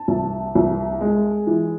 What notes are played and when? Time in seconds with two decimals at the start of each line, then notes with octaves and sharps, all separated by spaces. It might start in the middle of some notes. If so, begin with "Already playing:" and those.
Already playing: A5
0.08 C2
0.55 C2
1.01 G#3
1.47 E3